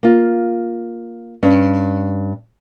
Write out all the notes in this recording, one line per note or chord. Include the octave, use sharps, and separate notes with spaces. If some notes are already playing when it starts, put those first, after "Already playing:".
A#3 F4
G2 C#4